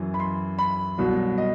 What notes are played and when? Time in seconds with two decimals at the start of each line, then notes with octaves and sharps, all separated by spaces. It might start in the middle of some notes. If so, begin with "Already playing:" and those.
Already playing: F#2 E3
0.14 B5
0.20 C6
0.59 B5
0.98 C2 B2 F#3
1.38 D#5